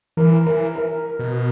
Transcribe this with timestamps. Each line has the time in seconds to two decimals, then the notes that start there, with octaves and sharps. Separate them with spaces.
0.17 E3 A#4
0.46 E3 A#4
0.76 A#4
1.19 B2